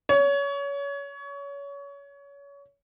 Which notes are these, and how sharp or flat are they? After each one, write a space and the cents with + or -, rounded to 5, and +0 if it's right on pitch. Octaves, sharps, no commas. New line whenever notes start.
C#5 +25